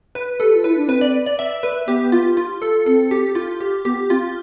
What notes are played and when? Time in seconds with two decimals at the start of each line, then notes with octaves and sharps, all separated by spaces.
0.15 B4
0.40 G4 A4
0.54 F4
0.64 E4 B4
0.78 D4
0.88 C4 B4
1.01 D5
1.26 D5
1.39 E5
1.63 B4
1.87 B3 G4
2.12 F4
2.37 F4
2.62 A4
2.86 C4 A4
3.11 G4
3.35 F4
3.61 G4
3.85 B3 G4
4.10 C4 F4